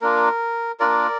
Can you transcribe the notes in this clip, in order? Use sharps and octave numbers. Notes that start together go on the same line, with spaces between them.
A#3 D4 F4 A#4
A#3 D4 F4 A#4 D5